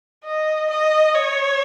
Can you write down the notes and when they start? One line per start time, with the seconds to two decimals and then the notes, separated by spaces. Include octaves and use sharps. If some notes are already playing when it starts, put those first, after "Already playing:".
0.24 D#5
0.70 D#5
1.14 C#5